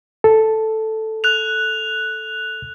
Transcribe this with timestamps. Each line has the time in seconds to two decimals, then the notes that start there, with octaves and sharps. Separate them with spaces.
0.24 A4
1.24 F#6 F7